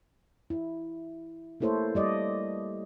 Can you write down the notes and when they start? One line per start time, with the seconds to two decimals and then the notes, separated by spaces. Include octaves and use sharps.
0.50 E4
1.60 A3 A#3 E4 A4 C5 C#5
1.95 G3 D5 D#5